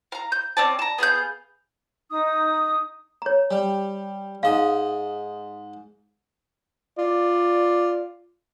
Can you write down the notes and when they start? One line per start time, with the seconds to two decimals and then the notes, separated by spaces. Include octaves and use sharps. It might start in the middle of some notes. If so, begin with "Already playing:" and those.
0.12 F5 A#5
0.32 G6
0.57 C4 C#4 D5 A5
0.79 A5 A#5
0.98 B3 G#4 F5 G6
2.10 D#4 D#6
3.22 C#5 A#5
3.51 G3
4.43 G#2 D#5 F5
6.98 F4 D5